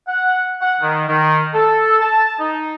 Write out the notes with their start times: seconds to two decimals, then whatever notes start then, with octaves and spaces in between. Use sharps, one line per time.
0.08 F#5
0.62 F#5
0.81 D#3
1.09 D#3
1.54 A4
2.00 A5
2.40 D#4